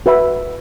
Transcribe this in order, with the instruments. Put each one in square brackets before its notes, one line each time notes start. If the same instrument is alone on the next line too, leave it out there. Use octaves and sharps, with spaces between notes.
[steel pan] F#4 B4 E5 B5